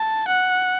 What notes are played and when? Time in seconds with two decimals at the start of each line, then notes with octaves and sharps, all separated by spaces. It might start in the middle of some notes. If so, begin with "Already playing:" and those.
Already playing: A5
0.28 F#5